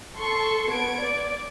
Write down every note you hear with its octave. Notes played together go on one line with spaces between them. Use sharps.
A4 C6 C#6
B3 G#6 D7
D5